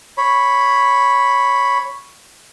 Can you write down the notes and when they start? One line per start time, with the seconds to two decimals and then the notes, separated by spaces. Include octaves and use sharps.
0.18 C#5 B5